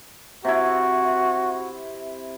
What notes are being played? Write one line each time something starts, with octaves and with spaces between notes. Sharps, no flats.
C3 E4 F#4